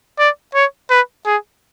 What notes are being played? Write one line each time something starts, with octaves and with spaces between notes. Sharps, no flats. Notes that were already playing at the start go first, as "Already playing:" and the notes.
D5
C#5
B4
G#4